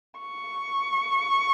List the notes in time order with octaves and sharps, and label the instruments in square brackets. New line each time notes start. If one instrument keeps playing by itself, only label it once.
[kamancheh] C#6